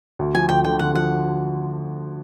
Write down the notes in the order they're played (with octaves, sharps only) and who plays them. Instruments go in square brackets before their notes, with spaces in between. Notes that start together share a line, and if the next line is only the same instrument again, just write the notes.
[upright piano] D2
[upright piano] F3 [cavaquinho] G#5
[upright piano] D2 [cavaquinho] G5
[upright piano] D3 [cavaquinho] G5
[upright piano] D3 [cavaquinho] F#5
[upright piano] F3 [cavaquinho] F#5